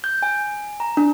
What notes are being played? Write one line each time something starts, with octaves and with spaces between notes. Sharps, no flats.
G6
G#5
A#5
D4